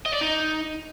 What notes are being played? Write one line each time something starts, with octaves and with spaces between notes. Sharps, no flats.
D#5
D5
D#4